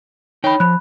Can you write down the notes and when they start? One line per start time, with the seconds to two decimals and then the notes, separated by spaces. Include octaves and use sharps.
0.44 D#4 C#5 G5 B5
0.60 F3 B5 F#6